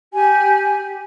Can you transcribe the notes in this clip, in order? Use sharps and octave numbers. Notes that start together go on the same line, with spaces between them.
G4 G#5